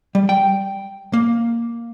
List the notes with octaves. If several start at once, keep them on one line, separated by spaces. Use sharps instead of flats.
G3
G5
A#3